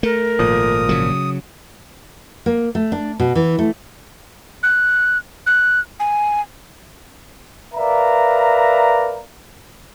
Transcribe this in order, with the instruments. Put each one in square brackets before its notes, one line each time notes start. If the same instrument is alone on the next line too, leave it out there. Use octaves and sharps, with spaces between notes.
[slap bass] A3 [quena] A#4
[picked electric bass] G#1 A#2 F3 [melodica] D#6
[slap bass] C#3 F#3
[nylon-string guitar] A#3
A3
D4
B2
E3
A3
[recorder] F#6
F#6
G#5
[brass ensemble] A#4 B4 D5 E5 F5 A#5